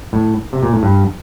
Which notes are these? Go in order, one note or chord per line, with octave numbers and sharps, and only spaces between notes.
A2
C3
A#2
A2
G2